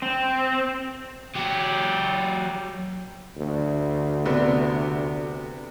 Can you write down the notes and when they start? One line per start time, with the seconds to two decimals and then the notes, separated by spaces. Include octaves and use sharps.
0.02 C4
1.35 F#3 G4
3.37 D2
4.25 C3 B3 D4